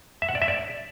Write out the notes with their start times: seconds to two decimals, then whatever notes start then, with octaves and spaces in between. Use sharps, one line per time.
0.22 E5
0.29 F#5
0.35 D5
0.42 E5
0.48 D5